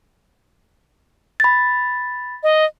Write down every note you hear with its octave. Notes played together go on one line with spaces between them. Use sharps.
B5 A6
D#5